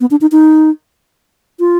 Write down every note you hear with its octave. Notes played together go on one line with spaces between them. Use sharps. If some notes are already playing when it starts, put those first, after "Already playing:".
B3
D4
D#4
D#4
F4